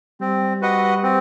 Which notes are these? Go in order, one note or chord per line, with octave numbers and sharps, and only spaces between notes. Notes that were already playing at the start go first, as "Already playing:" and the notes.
G3 C4
F#4 B4 D#5 F#5
C4